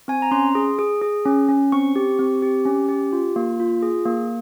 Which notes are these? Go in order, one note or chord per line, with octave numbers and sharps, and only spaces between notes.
C4 G#5
A#5
C#4 C6
G#4
G#4
G#4
C#4
C#4
C4 C#6
G4
C4
G4
C#4
G4
F4
A#3
F4
G#4
A#3